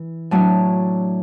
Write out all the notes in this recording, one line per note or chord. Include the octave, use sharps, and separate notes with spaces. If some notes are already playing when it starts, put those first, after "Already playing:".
Already playing: E3
A2 F#3 A3 D4